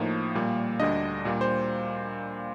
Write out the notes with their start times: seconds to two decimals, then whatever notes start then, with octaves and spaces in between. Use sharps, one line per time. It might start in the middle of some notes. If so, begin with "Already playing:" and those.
Already playing: A2 F3 A#3 D#4
0.35 A#2 G3 A#3
0.80 D2 D3 G3 D4 D#5
1.25 A#2 G3 A#3
1.41 C5